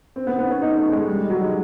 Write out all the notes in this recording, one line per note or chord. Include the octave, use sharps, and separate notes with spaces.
C4
B3
B3
C#4
D#4
A3
G#3
G3
F#3
G#3